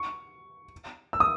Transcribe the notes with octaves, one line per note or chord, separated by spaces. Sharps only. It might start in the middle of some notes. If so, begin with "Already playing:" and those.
Already playing: C#6
E6
D#6